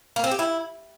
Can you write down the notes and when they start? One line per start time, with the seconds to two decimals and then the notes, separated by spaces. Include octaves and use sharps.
0.16 A#3
0.24 C4
0.31 G4
0.39 E4